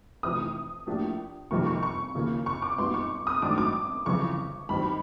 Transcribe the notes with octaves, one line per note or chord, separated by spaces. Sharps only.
F1 F2 C3 E3 D#6
A2 F3 A#3 D4 G4
F2 C3 D#3 G3 A#3 C#6
C#6
C#6
D#2 C#3 F3 A#3
C#6
D6
A#2 G3 B3 D#4 C6
C#6
D#6
G#2 D#3 F#3 A3 D4 D6
D6
G1 F2 C#3 E3 C#6
G2 D#3 G3 C4 B5